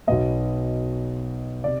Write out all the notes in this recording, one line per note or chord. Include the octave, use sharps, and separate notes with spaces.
B1 B2 B3 D#5
C3 D5